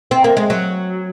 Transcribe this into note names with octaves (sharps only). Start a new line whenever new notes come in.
C4
A#3
G#3
F#3